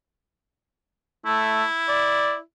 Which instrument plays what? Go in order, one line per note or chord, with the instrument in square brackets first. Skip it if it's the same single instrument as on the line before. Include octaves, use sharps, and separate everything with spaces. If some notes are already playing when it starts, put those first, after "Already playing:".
[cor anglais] A3 [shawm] E4
[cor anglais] D5